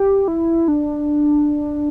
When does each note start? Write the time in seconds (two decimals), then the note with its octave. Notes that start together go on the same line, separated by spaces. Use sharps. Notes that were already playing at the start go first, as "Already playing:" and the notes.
Already playing: G4
0.28 E4
0.68 D4